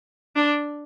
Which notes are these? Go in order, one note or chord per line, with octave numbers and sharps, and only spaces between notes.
D4